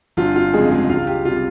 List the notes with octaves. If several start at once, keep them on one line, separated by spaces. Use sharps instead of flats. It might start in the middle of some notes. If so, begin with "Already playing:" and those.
G1 F4
F4
F2 C#3 G3 G#3 G#4
G#3 G#4
C#2 F4 F5
G4
C3 G3 F4